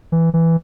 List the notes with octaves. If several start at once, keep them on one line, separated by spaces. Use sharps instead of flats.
E3
E3